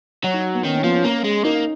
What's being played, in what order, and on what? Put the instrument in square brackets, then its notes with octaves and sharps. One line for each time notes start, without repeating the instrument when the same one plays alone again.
[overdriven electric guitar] F#3 [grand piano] C#5
[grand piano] D#4
B3
[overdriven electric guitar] D#3 [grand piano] C#4
[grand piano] C#4
[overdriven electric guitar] F3 [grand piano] B3
[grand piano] C#4
[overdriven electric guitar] A#3
G#3
[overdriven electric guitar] A#3 [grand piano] D#4